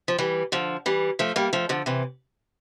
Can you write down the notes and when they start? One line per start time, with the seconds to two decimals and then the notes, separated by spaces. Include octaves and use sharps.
0.08 F3
0.18 E3 G3
0.52 D3 F3
0.86 E3 G3
1.19 F3 A3
1.36 G3 A#3
1.53 F3 A3
1.69 D3 F3
1.86 C3 E3